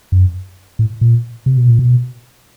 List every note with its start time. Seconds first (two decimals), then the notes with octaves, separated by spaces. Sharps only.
0.12 F#2
0.79 A2
1.01 A#2
1.46 C3
1.57 B2
1.68 A#2
1.79 B2